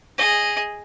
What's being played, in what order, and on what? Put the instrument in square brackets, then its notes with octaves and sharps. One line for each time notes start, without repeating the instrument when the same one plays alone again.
[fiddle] G#4 D#5